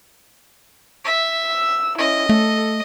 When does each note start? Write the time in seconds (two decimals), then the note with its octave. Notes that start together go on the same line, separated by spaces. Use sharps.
1.05 E5
1.47 E6
1.98 C#4 E4 D#5
2.29 A3 A4